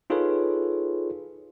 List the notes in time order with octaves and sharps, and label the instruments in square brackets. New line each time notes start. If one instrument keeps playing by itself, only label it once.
[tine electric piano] D#4 F4 G#4 A4 B4 C#5